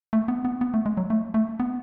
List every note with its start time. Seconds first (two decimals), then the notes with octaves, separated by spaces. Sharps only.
0.13 A3
0.28 B3
0.45 B3
0.61 B3
0.74 A3
0.86 G#3
0.97 F#3
1.10 A3
1.34 A3
1.60 B3